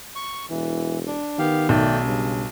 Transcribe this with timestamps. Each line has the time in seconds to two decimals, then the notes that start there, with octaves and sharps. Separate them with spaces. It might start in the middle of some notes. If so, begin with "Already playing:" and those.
0.16 C#6
0.50 E1 E3
1.07 D4
1.39 D#3 B3 G4 F5
1.69 B1 A3 D5 G5
2.04 G2 C#3